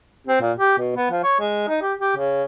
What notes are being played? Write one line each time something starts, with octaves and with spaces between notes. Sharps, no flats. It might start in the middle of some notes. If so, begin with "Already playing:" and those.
C4
A#2
G4
B2
B3
F3
C#5
G#3
D#4
G4
G4
C#3